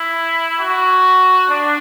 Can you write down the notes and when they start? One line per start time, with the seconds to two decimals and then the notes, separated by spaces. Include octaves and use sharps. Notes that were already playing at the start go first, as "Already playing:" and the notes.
Already playing: E4
0.58 F#4
1.49 D4